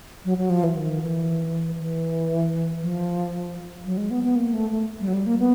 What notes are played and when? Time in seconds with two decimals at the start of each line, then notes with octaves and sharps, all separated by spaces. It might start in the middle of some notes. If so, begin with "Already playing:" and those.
0.25 F#3
0.38 F#3
0.50 F3
0.63 E3
0.76 D#3
1.02 E3
1.80 E3
2.82 F3
3.85 F#3
3.97 G#3
4.11 B3
4.24 B3
4.36 A#3
4.54 A3
4.70 A3
5.01 G3
5.07 F#3
5.14 G3
5.26 A#3
5.39 B3